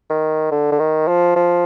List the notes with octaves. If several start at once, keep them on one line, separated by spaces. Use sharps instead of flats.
D#3
D3
D3
D#3
F3
F3